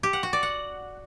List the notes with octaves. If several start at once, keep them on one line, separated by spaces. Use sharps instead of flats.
G4
F#5
F#4
D5
F#5